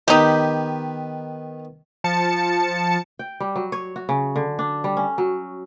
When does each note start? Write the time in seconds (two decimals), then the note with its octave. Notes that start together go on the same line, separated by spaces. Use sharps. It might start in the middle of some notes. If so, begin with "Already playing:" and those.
0.08 D#3 B3 D#4 G4 B4
2.04 F3 A5 C#7
3.19 G5
3.40 G3
3.56 F#3
3.72 C#5
3.96 F#4
4.09 C#3
4.36 D3
4.59 D4
4.84 G3
4.97 C#4
5.18 F#3